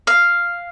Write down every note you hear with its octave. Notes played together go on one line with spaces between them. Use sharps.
F5